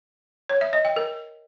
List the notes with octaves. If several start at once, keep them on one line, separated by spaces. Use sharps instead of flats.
C#5
E5
D#5
G5
A#4